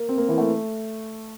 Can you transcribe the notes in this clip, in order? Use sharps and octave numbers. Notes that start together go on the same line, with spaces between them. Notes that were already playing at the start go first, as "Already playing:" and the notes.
Already playing: A#3
C4
A#3
E3
A3